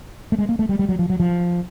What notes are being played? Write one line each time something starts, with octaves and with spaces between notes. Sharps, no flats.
A3
G#3
A#3
A3
G3
G3
F#3
F3
F#3
F3